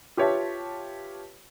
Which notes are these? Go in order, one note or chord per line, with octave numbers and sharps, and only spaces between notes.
F4 G4 B4 C#5 E5 A5